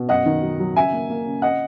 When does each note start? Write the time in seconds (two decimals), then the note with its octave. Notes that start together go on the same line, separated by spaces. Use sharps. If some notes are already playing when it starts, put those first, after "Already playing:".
Already playing: B2
0.09 F#2 D#5 F#5
0.26 D#3
0.42 F#3
0.60 F#3
0.76 C#3 E5 G#5
0.93 A#3
1.10 A#3
1.25 C#3
1.42 D#5 F#5